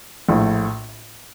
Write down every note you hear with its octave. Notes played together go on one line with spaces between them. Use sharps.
A#1 A2